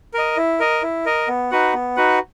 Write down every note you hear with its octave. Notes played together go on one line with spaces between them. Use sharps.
A#4 D#5
E4
A#4 D#5
E4
A#4 D#5
B3
D#4 F#4 B4 F#5
B3
D#4 F#4 B4 F#5